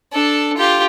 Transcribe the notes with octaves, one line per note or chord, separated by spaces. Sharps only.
D4 A4
F4 G4